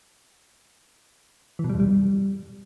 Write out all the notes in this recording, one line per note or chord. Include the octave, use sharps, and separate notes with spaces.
E3
B2
G3
F2
G3